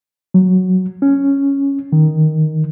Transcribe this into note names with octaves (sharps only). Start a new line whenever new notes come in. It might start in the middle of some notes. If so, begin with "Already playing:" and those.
F#3
C#4
D#3